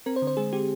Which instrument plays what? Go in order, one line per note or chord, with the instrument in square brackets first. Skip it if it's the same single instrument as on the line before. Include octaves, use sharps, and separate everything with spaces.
[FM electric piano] C4 A#4
C5
D3
C5
G#3 G#4
C4 G4